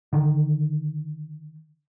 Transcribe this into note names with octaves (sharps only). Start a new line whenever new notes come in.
D3 D#3